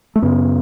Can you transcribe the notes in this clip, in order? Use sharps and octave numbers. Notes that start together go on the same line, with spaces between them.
A3
F#2 C#3 B3